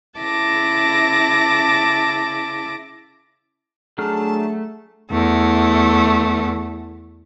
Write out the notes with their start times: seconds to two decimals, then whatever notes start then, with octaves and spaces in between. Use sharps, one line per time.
0.19 C#3 E4 A5 D6 A#6
3.98 F#3 A3 D4 G#4 A5 F6
5.11 E2 A3